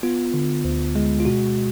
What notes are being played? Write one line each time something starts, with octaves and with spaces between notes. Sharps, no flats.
B3 F4
D3
D2
G#3
F4
B2 F#4